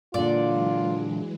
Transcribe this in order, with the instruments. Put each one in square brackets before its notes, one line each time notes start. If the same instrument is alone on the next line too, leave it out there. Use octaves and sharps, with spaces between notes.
[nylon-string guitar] A#2 D3 [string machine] E3 F#3 G#3 [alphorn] F4 [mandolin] D5